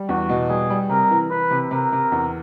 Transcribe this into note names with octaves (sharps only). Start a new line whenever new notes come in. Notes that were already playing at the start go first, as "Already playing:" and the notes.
Already playing: G3
E2 F#4
B2
G3 G#4
G3
C3 A#4
E3
E3 B4
C3
C3 A#4
C3
E2